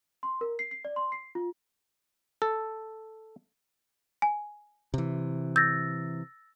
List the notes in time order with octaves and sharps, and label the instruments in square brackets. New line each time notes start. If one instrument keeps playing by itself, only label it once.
[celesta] C6
A#4
C7
C7
D5
C6
C7
F4
[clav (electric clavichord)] A4
[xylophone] G#5
[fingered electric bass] C3 E3
[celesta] E6 A6 A#6 [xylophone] G6